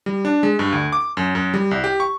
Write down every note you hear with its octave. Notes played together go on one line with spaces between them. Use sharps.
G3
D4
G#3
G2
D2
D6
F#2
F#2
G3
C2
G4
C#6